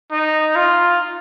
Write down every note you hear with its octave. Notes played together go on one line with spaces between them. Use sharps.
D#4
F4